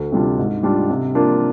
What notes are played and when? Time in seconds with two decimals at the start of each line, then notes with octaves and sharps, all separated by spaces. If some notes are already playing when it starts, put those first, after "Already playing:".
Already playing: D2
0.12 C3 G3 D4 F4
0.38 G#2
0.63 G3 D4 F4
0.90 C3
1.15 F3 A#3 D4 F4